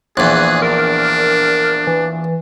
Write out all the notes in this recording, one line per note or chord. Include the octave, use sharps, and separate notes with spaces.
A#1 E2 G#4 F#6
D4 A#4
E3